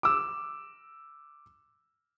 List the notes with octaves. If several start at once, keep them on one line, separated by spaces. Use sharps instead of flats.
D6 E6